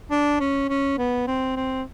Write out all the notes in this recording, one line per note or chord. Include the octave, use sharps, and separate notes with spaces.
D4
C#4
C#4
B3
C4
C4